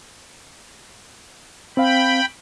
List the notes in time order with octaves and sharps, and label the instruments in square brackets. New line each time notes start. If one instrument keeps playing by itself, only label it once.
[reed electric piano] C4 F5 [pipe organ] G5 B5